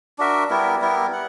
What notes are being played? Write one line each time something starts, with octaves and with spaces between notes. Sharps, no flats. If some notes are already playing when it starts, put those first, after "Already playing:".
D4 F#4 A#4 E5
G3 B3 E4 A#4
G3 B3 E4 A#4
F#5